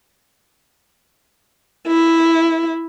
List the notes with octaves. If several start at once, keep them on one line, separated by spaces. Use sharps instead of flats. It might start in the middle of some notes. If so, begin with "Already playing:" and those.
E4